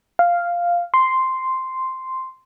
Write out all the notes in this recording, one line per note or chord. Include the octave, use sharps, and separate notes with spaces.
F5
C6